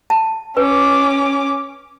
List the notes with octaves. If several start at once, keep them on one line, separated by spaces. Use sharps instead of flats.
A5
C#4 B4 D6